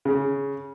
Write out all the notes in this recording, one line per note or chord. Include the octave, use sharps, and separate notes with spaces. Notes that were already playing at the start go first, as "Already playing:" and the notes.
C#3